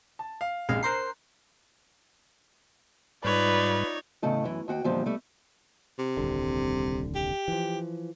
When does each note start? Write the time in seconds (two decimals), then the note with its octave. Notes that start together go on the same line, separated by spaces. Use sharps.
0.19 A5
0.41 F5
0.69 A#1 C3 G#3 F5
0.83 A#4 C5 A#5 F#6 C7
3.24 G#2 G3 D#4 F4 B4 C#5 D5
4.22 E2 A2 C#3 A3 A4 D#5
4.44 F#2 E3
4.68 D#2 F#4 F#5 G5
4.84 E2 A#2 D3 F3 G3
5.06 G3 A3
5.98 C3
6.17 D#1 C2 D3
7.15 G4
7.48 E3 F3